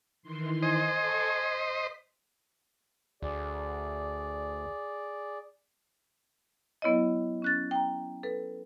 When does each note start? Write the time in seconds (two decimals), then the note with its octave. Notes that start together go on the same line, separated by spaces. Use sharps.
0.22 D#3 E3 C6
0.62 C5 D#5 G#5
0.98 A4 A5 C#6
1.29 B6
3.22 D2 G#4 D5
6.82 F#3 B3 E4 C#5 D#5
7.42 C#4 F#6 A6
7.71 G5 A#5
8.23 A4 B4